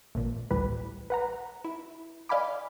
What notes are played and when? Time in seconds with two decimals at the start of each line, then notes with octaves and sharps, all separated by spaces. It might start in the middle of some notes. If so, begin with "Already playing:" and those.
0.15 A1 A#2
0.51 A1 D2 A2 G3 B4
1.10 B4 F#5 A#5
1.64 E4
2.29 D5 D#5 F5 G#5 B5 D6